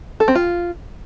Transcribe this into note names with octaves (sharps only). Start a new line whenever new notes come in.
A4
C4
F4